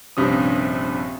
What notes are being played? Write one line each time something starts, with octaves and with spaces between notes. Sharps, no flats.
A#1 G2 C3 C#4 D#6